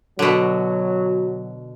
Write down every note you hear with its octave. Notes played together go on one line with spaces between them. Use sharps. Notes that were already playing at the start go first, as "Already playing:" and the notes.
B2 D3 F#3